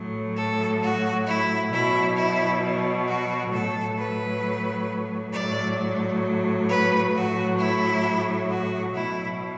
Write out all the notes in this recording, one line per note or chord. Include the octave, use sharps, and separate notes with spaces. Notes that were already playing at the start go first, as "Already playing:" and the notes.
Already playing: A2 F#3
A4
F#4
E4
B2 F#3 E4
E4
F#4
A2 F#3 A4
B4
A2 F#3 D5
B4
A2 F#3 F#4
E4
F#4
B2 F#3 E4